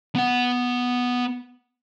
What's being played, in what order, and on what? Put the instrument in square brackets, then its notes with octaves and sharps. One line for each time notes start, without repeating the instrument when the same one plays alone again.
[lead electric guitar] B3 F#5